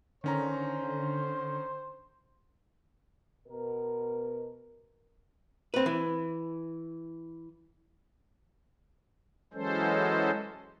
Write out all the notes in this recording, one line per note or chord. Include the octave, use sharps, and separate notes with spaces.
D3 D#3 C#4 C5 A#5
B2 A#4
C4 B4
E3
E3 F#3 G#3 C#4 A4 C5